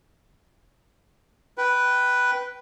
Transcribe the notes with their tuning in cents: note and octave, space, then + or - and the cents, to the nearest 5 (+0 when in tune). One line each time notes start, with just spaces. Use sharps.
B4 +0 G5 -20